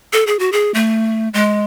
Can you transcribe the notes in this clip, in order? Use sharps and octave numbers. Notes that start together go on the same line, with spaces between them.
A4
G#4
F#4
G#4
A3
G#3